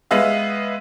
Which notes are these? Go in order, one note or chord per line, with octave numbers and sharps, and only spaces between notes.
G#3 B3 E5 F5